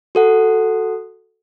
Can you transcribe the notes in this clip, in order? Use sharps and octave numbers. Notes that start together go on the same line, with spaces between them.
F#4 A4 F#5